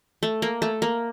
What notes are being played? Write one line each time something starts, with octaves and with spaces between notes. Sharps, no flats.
A3
A#3
A3
A#3